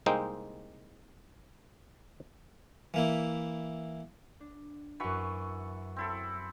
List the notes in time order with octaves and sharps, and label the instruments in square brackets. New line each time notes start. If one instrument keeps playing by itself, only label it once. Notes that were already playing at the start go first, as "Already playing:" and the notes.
[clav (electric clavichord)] C2 G#3 A#3 C4 D#4 G5
[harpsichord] E3 A#3 E4
[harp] D4
[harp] F#2 B6 [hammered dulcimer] E3 F#4 C#6
[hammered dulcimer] C4 E4 A4